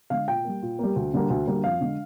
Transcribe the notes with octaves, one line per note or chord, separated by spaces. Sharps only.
D3 G#3 F5
A#2 G5
G3 A#3
A#2
G3 A#3
D2
D3 G3 A#3
D2
D3 G3 A#3
F2 F5
D3 G#3